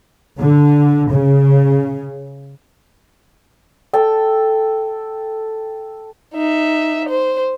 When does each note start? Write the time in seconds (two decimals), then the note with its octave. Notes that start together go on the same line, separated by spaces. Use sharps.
0.41 D3
1.13 C#3
3.93 A4 G5
6.34 D#4 E5
7.09 C5